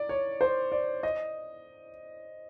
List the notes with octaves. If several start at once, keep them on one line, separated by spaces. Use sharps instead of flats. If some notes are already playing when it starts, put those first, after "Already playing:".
Already playing: D5
C#5
C5
D5
D#5